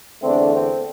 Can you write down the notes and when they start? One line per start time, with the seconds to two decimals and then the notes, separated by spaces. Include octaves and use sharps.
0.22 E2 D3 A3 C4 D4
0.51 C4